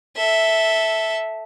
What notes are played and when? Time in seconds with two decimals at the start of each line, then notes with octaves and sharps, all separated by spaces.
0.17 A4 E5